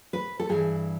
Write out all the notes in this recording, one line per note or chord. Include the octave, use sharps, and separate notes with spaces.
B4
A4
G2 E3 G#4